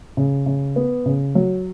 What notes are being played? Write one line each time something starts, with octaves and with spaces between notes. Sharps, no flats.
C#3
C#3
B3
C#3
F#3